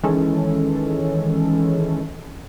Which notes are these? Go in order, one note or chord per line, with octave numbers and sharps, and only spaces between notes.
D#3 E3 G#3 C#4 A4